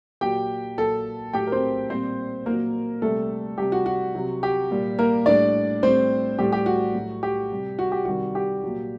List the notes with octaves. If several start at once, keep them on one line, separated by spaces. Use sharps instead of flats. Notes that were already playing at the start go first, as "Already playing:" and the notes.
A#2 F#3 G4 G5
A#2 F#3 A4 A5
A2 F#3 G4 G5
A#4
C4 C5
A#2 G3 C4 C5
A#2 F#3 A#3 A#4
C3 G3 A3 A4
C3 G3 G4
F#4
F#4
C3 F#3
G4
A#2 G3
A#3 A#4
A2 G3 D4 D5
A2 G3 C4 C5
A2 G3 G4
G4
F#4
A2 F#3
G4
C3 G3
F#4
G4
C3 D#3 G3 F#4
G4
A#2 F#3